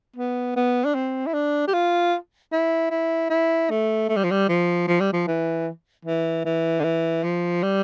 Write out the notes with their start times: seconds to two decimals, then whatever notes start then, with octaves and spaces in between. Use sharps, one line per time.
0.16 B3
0.56 B3
0.85 D4
0.95 C4
1.27 E4
1.34 D4
1.68 G4
1.74 F4
2.52 E4
2.91 E4
3.30 E4
3.70 A3
4.09 A3
4.16 G3
4.24 F3
4.31 G3
4.49 F3
4.88 F3
5.00 G3
5.13 F3
5.28 E3
6.05 E3
6.45 E3
6.80 D3
6.84 E3
7.24 F3
7.63 G3